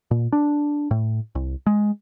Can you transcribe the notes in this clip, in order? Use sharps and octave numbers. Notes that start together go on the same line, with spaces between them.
A#2
D4
A2
C2
G#3